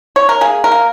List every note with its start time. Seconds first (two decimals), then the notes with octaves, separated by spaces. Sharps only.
0.16 C#5
0.29 A#4
0.41 A#3 G#4
0.64 A#4
0.72 A#3